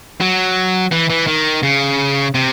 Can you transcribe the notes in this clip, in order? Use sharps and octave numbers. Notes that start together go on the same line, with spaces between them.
F#3
E3
E3
D#3
C#3
C3